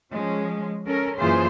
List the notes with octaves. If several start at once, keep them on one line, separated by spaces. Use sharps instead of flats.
F3 G#3 C#4
C#4 A4 A#4
F#2 A#2 E3 F4 G#4 C5